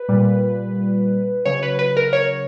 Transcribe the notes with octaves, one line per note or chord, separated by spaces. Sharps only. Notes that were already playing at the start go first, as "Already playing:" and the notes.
Already playing: B4
A#2 G3
C#3 F#3 C#5
B4
B4
A#4
C#5